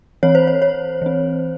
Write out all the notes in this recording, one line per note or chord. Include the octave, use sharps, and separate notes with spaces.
E3 C4 C#5
C5
C#5
C#5
E3 C4